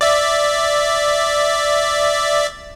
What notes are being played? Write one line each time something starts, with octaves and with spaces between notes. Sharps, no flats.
D5 E5